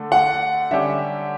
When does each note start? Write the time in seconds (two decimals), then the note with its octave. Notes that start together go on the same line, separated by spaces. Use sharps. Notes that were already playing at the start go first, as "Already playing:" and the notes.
Already playing: D3 A3 D4 A4
0.12 F#5
0.71 D3 G3 C#4 G4 E5